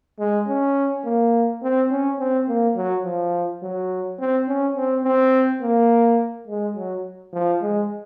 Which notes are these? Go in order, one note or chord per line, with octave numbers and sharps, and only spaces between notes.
G#3
C#4
A#3
C4
C#4
C4
A#3
F#3
F3
F#3
C4
C#4
C4
C4
A#3
G#3
F#3
F3
G#3